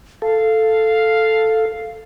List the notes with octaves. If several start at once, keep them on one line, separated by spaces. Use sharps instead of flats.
A4 F5